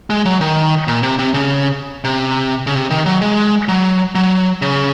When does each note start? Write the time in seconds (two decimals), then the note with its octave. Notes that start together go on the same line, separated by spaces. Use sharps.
0.10 G#3
0.25 F#3
0.41 D#3
0.88 A#2
1.03 C3
1.19 C3
1.34 C#3
2.04 C3
2.67 C#3
2.75 C3
2.90 D#3
3.06 F#3
3.21 G#3
3.68 F#3
4.15 F#3
4.62 C#3